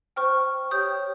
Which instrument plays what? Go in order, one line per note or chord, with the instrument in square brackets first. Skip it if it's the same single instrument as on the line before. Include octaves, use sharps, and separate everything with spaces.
[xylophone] C5 G5 C#6 F6
G4 C#5 G5 D#6 G6